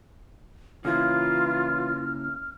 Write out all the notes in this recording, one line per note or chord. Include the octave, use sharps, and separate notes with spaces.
C#3 E3 A#3 E4 F4 F6